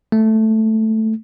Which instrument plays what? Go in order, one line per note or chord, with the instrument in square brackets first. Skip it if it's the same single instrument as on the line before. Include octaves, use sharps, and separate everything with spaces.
[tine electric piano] A3